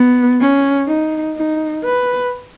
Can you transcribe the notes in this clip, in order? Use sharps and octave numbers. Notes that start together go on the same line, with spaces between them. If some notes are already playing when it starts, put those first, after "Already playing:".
Already playing: B3
C#4
D#4
D#4
B4